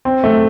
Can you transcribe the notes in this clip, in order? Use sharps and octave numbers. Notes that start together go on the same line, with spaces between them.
C4
A3